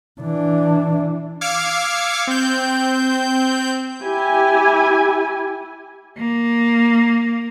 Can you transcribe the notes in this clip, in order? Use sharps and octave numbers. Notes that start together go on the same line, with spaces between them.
E3 D4
F5 D6 E6 F6 G#6 C#7
C4 G6
E4 G4 G#5
A#3